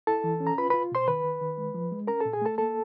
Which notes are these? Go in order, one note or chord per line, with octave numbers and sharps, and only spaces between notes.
E4 A4 A5
E3
C#4
A#5
F4 B4 B5
F4 B4 B5
B2 C5 C6
D#3 B4 B5
D#3
D#3
G#3
F3
G#3
C#4 A#4 A#5
A#2 A4 A5
G#4 G#5
A3 A4 A5
A#3 A4 A5